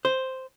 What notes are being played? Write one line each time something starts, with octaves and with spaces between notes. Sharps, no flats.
C5